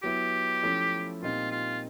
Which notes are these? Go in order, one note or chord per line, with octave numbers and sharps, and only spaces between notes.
F#3 B3 E4 G4
F3 A3 C#4 E4
A#2 G3 C4 D#4 F4
F4